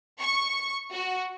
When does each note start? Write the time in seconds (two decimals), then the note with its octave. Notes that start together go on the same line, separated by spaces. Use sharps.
0.20 C#6
0.93 F#4